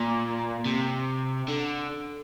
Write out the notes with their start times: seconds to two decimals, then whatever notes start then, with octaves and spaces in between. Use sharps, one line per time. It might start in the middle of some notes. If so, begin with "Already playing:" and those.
Already playing: A#2
0.66 C3
1.48 D3